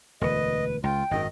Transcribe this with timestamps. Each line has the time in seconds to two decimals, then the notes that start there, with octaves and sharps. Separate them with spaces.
0.21 E1 D2 B4 D#5
0.84 C#2 F4 G5
1.11 G#1 F#2 D#3 D#5